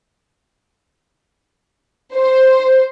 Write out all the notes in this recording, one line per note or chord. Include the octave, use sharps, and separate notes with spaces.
C5